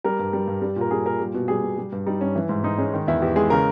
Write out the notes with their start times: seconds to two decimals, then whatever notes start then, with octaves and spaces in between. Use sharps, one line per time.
0.04 G3 A#4
0.19 G2
0.33 G3
0.48 G2
0.62 G3
0.76 A#2 A#4
0.91 G3 G#4
1.05 A#2 A#4
1.20 G3
1.34 B2
1.48 G3 G#4
1.63 B2
1.78 G3
1.92 G2
2.06 G3 D#4
2.21 G2 C#4
2.36 E3
2.49 G#2
2.64 G#2 D#4
2.78 G#3 C#4
2.94 D#3
3.08 E2 E4
3.22 E2 G4
3.36 G#3 G#4
3.50 C#3 A#4